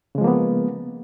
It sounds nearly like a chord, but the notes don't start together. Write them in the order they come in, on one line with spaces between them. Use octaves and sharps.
C#3 G#3 F3 A#3 B3